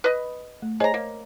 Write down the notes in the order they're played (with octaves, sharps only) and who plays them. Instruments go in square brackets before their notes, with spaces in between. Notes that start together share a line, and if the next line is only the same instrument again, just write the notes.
[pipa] B4 D#5
[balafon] A3
[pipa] G#4 A#5 [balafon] C5 C#5 D#5
[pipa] A#3